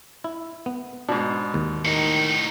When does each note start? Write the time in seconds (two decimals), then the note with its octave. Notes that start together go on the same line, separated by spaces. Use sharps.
0.24 E4
0.66 B3
1.09 G#2 B2 D4
1.54 D#2
1.85 A2 D#3 D#4